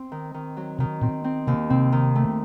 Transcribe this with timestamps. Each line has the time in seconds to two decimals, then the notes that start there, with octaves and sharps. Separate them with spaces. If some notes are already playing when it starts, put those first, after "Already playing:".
Already playing: C4
0.12 D#3
0.34 D#3
0.57 F#3
0.79 C3 D#3
1.02 A#2 C4
1.24 C4
1.47 D#2 C3
1.70 C3 C4
1.92 D#3
2.16 A3